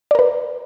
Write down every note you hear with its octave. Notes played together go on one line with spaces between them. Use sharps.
A#4 B4 D5